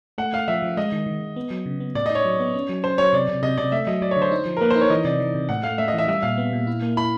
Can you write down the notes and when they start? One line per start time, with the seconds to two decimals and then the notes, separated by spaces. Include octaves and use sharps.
0.18 A3 F#5
0.33 A3 F5
0.48 F3 E5
0.62 F3
0.77 G#3 D#5
0.92 D#3
1.06 D#3
1.21 D#3
1.36 B3
1.51 F#3
1.66 C#3
1.80 B3
1.95 A2 D5
2.06 D#5
2.10 D#4 C#5
2.25 F#3
2.40 B3
2.54 C#4
2.69 F#3
2.83 C#4 C5
2.98 F#3 C#5
3.13 C3 D5
3.28 C3
3.43 C3 D#5
3.57 C3 D5
3.72 A3 E5
3.87 F#3 D#5
4.02 F#3 D5
4.11 C#5
4.17 D3
4.22 C5
4.32 D#4
4.46 F3
4.57 A#4
4.61 A#3 B4
4.71 C5
4.76 D#4
4.81 C#5
4.90 E3 D#5
5.04 C3 D5
5.20 E3
5.35 C3
5.49 A2 F#5
5.63 A3 F5
5.78 A3 E5
5.88 D#5
5.94 E3 E5
6.08 G3 E5
6.22 A#2 F5
6.38 B3
6.53 A#2
6.67 E4
6.82 A#3
6.97 E4 B5